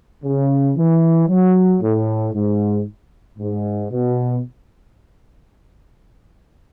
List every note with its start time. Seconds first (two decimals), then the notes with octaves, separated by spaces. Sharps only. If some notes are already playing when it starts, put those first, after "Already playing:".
0.24 C#3
0.77 E3
1.29 F#3
1.82 A2
2.34 G#2
3.39 G#2
3.92 B2